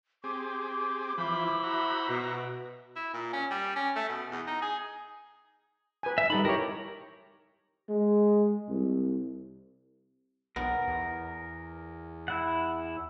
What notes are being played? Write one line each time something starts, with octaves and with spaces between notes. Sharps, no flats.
C4 G4 G#4 D6
E3 F3 E4 C5 B5
F#4 E5 A#5
B2
E4
A#2
C#4
G3
C#4
A3
B2
E2
D#4
G#4
B4 G#5
E5
G3 D#4 A4 B5
E4 G4 A#4 C#5
G#3
C2
B1 B3 A#4
E2
E4 F#5